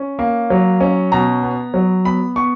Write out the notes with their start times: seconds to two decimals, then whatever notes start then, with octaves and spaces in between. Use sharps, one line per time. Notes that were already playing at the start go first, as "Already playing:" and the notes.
Already playing: C#4
0.19 A#3
0.50 F#3
0.81 C#4
1.12 B2 A#5
1.43 B3
1.74 F#3
2.05 B3 B5
2.36 B3 C#6